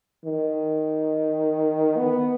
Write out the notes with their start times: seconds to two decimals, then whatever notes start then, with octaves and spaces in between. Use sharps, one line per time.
0.25 D#3
1.97 B3